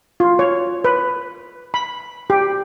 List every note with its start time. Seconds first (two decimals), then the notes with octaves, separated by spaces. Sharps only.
0.20 F4
0.39 C#5
0.84 B4
1.74 B5
2.30 G4